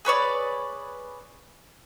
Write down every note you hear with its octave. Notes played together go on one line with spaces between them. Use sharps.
G#4 B4 C#5 D5